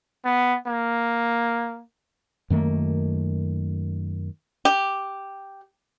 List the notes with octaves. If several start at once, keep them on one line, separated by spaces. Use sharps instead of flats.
B3
A#3
F#2 D#3 A3 A#3
G4